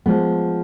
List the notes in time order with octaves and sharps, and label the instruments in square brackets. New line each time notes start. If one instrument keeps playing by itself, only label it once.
[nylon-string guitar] F3 G#3 B3